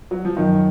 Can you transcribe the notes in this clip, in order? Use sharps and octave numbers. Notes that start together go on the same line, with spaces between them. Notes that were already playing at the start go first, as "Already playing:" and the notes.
F#3
F3
F#2 D#3